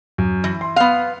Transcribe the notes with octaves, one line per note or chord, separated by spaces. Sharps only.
F#2
E3
C6
B3 F5